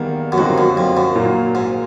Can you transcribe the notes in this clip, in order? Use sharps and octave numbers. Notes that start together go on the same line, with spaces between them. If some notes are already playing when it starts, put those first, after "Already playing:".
Already playing: E2 D#3 G3 A#3
F#2
F2 D3 G3 A#3 D#4 F#4
F#2
F2
F#2
A#2 F#3 A#3
G#2